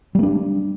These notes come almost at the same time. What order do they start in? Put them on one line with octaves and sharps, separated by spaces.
G3 A#3 D4